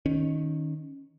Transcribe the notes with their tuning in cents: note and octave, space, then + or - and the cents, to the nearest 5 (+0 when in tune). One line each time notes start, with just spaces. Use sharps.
D#3 +0 C#4 +0